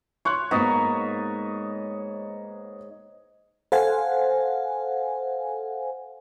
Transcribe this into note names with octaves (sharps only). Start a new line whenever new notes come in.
C#5 C6 C#6 F#6
G#2 A#3 B3 C#5 D#5
A4 C5 F5 F#5 G#5